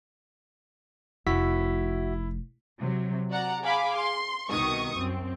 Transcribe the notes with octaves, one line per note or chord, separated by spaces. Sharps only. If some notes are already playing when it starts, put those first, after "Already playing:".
F1 E4 F#4 E5 B6
C3 F#3
F#4 D5 F#5 A#5
G#4 F5 G#5 B5 D6
C6
C2 B2 D#3 C#6 D#6
F#2 C4